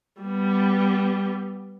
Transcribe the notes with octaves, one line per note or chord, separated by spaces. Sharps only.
G3 B3